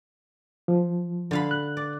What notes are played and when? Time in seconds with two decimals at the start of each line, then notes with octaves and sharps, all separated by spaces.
0.68 F3
1.31 D3 F5 B5
1.51 F#6
1.77 D5